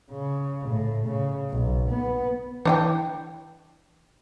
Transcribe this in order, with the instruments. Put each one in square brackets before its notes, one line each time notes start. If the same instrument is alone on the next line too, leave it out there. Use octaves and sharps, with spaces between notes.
[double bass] C#3
A2
C#3
B1
B3
[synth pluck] E3 [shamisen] D4 D#5 G5